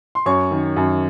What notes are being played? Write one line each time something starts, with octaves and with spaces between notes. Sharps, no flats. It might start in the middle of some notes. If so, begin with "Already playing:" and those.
C6
F#2 C#5 C#6
D#3
F#2